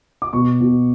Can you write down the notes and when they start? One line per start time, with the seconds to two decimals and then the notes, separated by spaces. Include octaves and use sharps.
0.22 D6
0.33 B2 C#6
0.60 B2